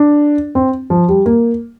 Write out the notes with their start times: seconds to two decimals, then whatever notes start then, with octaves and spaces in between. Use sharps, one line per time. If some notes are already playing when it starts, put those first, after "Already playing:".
Already playing: D4
0.55 C4
0.90 F3
1.09 G3
1.26 A#3